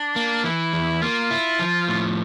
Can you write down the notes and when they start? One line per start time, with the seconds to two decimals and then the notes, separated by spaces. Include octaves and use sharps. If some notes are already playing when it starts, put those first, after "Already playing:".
Already playing: D4
0.16 A#3
0.44 E3 E4
0.73 E2
1.02 A#3 F4
1.31 E4
1.59 F3
1.88 A2